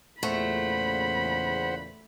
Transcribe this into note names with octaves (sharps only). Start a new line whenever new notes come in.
E2 A#2 C#3 A3 C5 F#5 B5